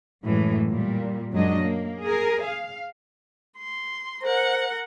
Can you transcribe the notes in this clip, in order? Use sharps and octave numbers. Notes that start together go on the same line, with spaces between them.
F#2 A2 E3 G#3
A#2 G3
F#2 F#3 G#3 D4 D#5
A#3
G#4 A#4
F5
C6
A#4 C5 F#5